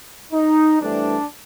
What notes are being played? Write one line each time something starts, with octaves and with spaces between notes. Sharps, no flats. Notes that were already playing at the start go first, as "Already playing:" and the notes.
D#4
G2 E3 A3 C4 D4